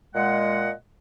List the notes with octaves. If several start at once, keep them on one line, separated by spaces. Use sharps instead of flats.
A#2 G#3 D#5 F#5